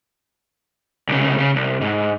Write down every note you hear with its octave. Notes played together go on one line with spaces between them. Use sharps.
C2 C#3
C#3
C2
G#2